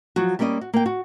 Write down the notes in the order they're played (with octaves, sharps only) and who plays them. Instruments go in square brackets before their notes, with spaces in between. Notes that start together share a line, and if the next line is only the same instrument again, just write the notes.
[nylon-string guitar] F3 F#3 F#4
G3 A#3 C#4 D5 D#5
F#4
A#3 G5
F#4